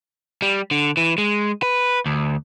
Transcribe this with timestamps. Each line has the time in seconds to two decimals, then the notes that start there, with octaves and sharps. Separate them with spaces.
0.42 G3
0.71 D3
0.97 E3
1.18 G#3
1.63 B4
2.06 D2